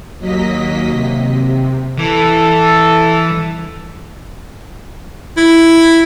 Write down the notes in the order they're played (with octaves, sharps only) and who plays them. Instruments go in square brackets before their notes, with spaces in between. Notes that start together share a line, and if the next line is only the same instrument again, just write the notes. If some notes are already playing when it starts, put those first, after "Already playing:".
[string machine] D#2 F#3 A#3 D#5 B6
C3
[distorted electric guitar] E3 [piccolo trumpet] A4
[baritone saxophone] E4